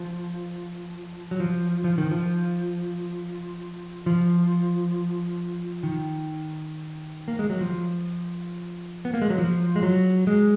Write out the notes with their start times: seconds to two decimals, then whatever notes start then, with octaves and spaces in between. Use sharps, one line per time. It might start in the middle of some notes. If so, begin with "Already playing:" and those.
Already playing: F3
1.31 F#3
1.40 F3
1.84 F3
1.98 D#3
2.11 F3
4.06 F3
5.83 D#3
7.28 A#3
7.39 G#3
7.50 F#3
7.61 F3
9.05 B3
9.14 A#3
9.22 G#3
9.30 F#3
9.38 F3
9.76 G#3
9.83 F#3
10.27 G#3